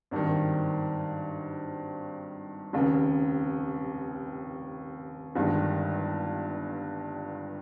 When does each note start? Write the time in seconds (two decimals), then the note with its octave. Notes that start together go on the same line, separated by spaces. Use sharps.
0.11 G#1 G2 D#3
2.73 F1 D#2 C#3
5.35 G1 G2 D#3 G#3